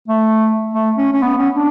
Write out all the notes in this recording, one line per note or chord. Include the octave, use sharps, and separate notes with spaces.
A3
A3
C#4
C#4
B3
C#4
D4